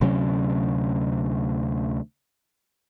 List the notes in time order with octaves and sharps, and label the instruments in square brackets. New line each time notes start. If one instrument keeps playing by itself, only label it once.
[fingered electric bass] D2 C3 F#3 C#4